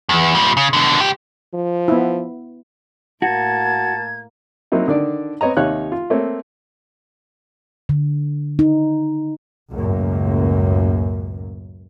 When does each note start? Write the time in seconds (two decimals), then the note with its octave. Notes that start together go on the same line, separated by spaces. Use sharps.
0.09 E2
0.35 A#2 G3
0.57 C#3
0.73 B2 D3
0.99 C#2 G4
1.54 F3
1.88 B3 E4
3.22 A2 A#3 F#4 A5 G#6
4.72 F#3 A#3 C4 D#4 E4
4.88 D3 D#3 D4 D5
5.41 B3 C4 C#5 D#5 A#5
5.57 D#2 C3 D#4 C#5 F5 F#6
5.92 F4
6.10 A3 A#3 C4 C#5
7.89 D3
8.59 D#4
9.73 C#2 F#2 A2 A#3